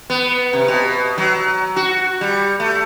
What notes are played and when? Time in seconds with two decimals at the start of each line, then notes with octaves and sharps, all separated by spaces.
0.10 B3
0.53 C3
0.68 B2
1.18 F#3
1.76 F#4
2.21 G3
2.60 A3